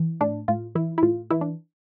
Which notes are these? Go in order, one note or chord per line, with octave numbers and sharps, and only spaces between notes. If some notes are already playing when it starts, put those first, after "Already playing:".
Already playing: E3
A2 D4
A2 F4
E3 E4
E4
A2 F4
E3 E4
D4